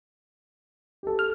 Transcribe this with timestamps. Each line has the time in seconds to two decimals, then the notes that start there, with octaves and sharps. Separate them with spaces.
1.03 G4 A4
1.19 F6